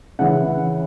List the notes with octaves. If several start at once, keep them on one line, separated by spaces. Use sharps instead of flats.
C#3 E3 F#5